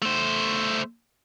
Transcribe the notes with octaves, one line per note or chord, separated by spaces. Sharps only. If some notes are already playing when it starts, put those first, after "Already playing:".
A3 C5